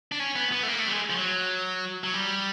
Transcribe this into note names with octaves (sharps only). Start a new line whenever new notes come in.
D4
C#4
B3
B3
A3
A#3
A3
G3
G#3
F3
F#3
F#3
G3